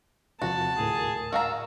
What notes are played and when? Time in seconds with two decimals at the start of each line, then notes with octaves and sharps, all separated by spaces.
0.42 E2 C3 F3 F#4 A5
0.77 D2 A2 G#4 A#4
1.32 F#4 F5 A#5 E6